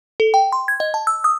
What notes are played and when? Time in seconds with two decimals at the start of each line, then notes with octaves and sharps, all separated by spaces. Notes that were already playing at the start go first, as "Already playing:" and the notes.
0.20 A4
0.34 G5
0.52 C6
0.68 G#6
0.80 D#5
0.94 A5
1.07 E6
1.24 D#6